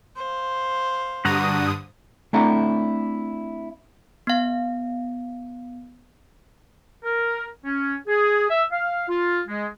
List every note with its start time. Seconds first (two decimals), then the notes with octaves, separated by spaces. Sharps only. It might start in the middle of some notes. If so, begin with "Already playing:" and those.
0.16 C5 F5
1.25 G2 D3 F#4 F#5 A#5 D#6
2.33 A3 C4 D4 E4 F#5 A#5
4.27 B3 F5
7.04 A#4
7.65 C#4
8.07 G#4
8.50 E5
8.72 F5
9.09 F4
9.47 G#3